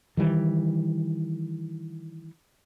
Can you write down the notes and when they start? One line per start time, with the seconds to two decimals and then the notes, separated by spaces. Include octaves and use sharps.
0.17 D#3 E3 G3